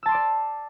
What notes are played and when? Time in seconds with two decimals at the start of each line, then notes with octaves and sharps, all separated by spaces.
0.03 E6
0.06 A5
0.09 C6
0.11 D6
0.14 D5